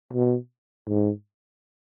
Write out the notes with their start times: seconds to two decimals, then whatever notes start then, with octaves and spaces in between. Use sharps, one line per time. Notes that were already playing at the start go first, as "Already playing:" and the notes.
0.13 B2
0.88 G#2